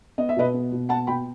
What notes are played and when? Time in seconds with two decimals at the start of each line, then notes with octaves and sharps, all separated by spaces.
0.18 B3 D#5
0.29 E5
0.36 B2 B4 D#5
0.54 B3
0.72 B2
0.89 B3 F#5 A5
1.07 B2 G5 B5